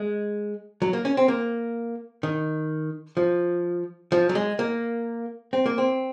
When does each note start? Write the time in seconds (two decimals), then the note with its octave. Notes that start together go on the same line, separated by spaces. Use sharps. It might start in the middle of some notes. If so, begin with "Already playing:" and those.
Already playing: G#3
0.82 F#3
0.93 A#3
1.05 C#4
1.17 C4
1.28 A#3
2.23 D#3
3.17 F3
4.12 F3
4.29 F#3
4.35 G#3
4.59 A#3
5.53 C4
5.66 A#3
5.78 C4